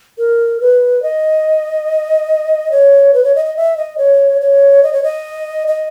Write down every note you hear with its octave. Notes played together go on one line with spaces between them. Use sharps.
A#4
B4
D#5
C#5
B4
C#5
D#5
D#5
E5
D#5
C#5
C#5
D#5
C#5
D#5
D#5